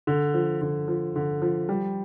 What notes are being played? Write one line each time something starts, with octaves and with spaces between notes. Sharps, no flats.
D3
F3
D3
F3
D3
F3
G3